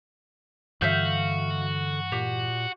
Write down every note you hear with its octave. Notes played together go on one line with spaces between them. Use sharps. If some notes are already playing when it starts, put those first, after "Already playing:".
G2 D3 E3 F#4 E5 F5 G6
A#2 G4